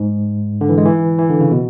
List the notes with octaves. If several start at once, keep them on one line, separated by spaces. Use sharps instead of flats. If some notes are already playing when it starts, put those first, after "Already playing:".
Already playing: G#2
D3
E3
G#3
E3
E3
D3
C#3
B2